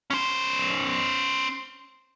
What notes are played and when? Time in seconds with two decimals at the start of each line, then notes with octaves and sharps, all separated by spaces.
0.10 C#4 C5